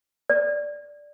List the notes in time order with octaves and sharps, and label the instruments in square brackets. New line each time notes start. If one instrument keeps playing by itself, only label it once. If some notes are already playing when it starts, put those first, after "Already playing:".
[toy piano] D5